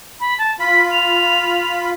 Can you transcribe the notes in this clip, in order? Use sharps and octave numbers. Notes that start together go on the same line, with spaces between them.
B5
A5
F4 B5 B6
F7